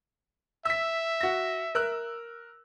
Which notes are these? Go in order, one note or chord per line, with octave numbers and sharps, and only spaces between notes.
E5 E6 B6
F#4 A#6
A#4 E6 F#6